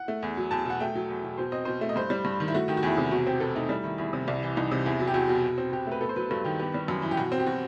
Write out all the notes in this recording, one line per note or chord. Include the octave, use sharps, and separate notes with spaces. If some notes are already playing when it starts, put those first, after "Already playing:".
Already playing: F#5
A3
E2
F#3
E2 A5
B2 F#5
A3 G5
F#3
E2
B2
B2 C5
C4 D#5
B2 C5
A3
D#5
G2 C5
G3
G2
D#3
E4
A3 F#4
D#3 G4
F#4
E2 E4
C3 F#4
B2 F#4
C4 G4
B2 A4
A3 D#4
G3 E4
D#3 E4
E2 E4
C3
C2 E4
E3
C2 D#4
C3
E2 E4
F#3
G4
E2 F#4
B2
B2
C4
B2 G4
A3 B4
B3 A4
C5
F#3 B4
G2 A4
D#3 G4
B3 G4
G3
F#2
E3
G4
B2 F#4
C4
G4
B2 F#4